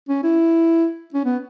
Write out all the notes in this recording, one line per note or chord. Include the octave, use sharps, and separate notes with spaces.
C#4
E4
C#4
B3